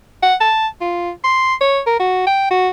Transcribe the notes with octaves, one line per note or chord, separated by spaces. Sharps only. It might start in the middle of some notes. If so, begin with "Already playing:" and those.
F#5
A5
F4
C6
C#5
A#4
F#4
G5
F#4